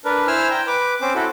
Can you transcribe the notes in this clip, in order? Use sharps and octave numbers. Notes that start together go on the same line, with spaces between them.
D4 A#4 B4
E4 C5 G#5 E6 F6
G5 A#5
B4 D6
C4 C#4 C5 D6
E4 F#4 A4